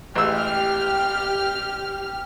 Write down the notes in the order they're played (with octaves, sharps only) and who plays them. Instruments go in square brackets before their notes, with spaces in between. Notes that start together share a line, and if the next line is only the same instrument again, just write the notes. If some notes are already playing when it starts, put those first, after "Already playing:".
[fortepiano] A1 G#3 E6 [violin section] G4 F6